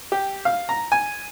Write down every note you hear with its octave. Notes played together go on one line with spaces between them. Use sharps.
G4
F5
A#5
G#5